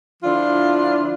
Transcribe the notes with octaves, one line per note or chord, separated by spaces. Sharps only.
D3 F3 D4 E4 F4